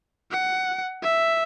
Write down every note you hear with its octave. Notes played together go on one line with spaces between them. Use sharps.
F#5
E5